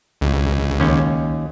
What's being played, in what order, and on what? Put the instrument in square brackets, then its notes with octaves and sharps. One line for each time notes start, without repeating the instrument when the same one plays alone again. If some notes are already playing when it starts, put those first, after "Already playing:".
[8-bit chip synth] C#2
[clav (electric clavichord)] D#2 C#4